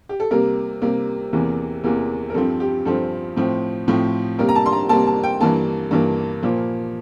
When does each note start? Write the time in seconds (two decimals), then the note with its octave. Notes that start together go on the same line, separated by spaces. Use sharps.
0.09 G4
0.20 A4
0.31 C3 G3 A#3 A#4
0.82 C3 G3 A#3
1.33 E2 C3 E3 A#3
1.84 E2 C3 E3 A#3
2.30 A#4
2.34 G2 F3 C4 A4
2.60 G4
2.85 G2 F3 C4 A4
3.36 A2 F3 C4
3.88 A2 F3 C4
4.39 C3 G3 A#3 A#4
4.49 A#5
4.55 A5
4.66 C6
4.72 A#5
4.89 C3 G3 A#3 A5
5.07 A5
5.24 G5
5.41 G2 E3 A#3 A5
5.91 G2 E3 A#3
6.43 A#2 F3 A#3